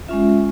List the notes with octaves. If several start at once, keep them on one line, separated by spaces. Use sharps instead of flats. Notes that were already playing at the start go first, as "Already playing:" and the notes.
G#3 C#4 F4 E5